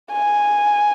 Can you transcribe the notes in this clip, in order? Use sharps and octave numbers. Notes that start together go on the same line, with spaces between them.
G#5